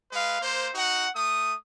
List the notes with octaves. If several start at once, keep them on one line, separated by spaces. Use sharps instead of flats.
G#3 B4 F5
A#3 C5
D#4 F#4 F#5
A3 D#6